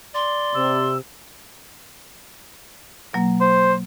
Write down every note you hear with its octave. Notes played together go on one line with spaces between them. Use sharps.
D5 C6
C3 E6
B2 F#3 A#3
C5